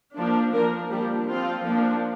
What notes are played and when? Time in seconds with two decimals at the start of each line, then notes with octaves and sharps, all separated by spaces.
0.17 F3 A#3 D4
0.54 F3 A#3 D4 A#4
0.91 F3 G3 A#3 D4 G4
1.28 F3 C4 F4
1.66 F3 A#3 D4